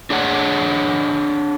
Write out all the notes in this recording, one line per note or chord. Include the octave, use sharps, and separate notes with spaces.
D4 G#4 C#5 F#5